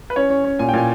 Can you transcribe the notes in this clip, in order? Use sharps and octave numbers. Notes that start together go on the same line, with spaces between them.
B4
C#4 C#5
C#4
C#4
A#2 G#5
G5
A#2 G#5